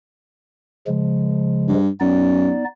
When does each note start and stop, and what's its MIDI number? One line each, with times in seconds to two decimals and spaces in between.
0.87 1.74 49
0.87 1.74 53
0.87 1.74 56
1.68 1.89 43
2.00 2.51 42
2.00 2.64 59
2.00 2.64 63
2.00 2.64 74